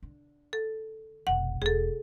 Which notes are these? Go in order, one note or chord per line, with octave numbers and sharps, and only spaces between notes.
D3
A4
F1 B1 F#5
E1 G#4 A4